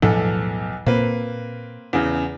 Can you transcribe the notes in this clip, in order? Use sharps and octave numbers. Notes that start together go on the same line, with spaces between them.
B1 E2 A2 F3 B3 A4
A#2 A#3 C4 B4
E2 C#3